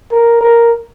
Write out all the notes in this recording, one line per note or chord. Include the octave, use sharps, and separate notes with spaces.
A#4
A#4